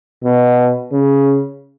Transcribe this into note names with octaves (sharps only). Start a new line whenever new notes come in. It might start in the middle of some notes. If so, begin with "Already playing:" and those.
B2
C#3